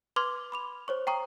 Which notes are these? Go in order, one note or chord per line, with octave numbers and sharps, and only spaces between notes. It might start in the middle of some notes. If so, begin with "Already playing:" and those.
B4 C6 D6 F6 G#6
B5 D6 F7
C5 C#5 C#6
G5 A#5 C#6 D#6